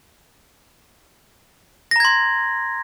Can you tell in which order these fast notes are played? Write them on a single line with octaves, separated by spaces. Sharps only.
A#6 A#5 G#6 C6